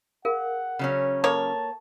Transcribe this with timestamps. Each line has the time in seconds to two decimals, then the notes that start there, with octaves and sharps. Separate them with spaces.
0.25 G#4 A#4 F5 F#5
0.79 C#3 F#3 C#4
1.24 A#3 A4 C#5 A5